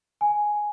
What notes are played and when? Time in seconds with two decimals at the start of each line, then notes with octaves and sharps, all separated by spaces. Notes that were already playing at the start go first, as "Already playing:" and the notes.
0.21 G#5